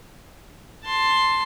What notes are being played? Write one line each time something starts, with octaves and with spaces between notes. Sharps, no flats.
A5 C6